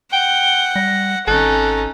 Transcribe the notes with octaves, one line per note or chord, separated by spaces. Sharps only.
F#5 G5 G7
G3 A#6
G#1 C#4 D#4 A4 F#6